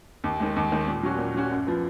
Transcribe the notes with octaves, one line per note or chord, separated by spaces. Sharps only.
D#2
D#3 G#3
D#2
D#3 G#3
A#2
F#3 C#4 F#4
A#2
F#3 C#4 F#4
F#2
F3 B3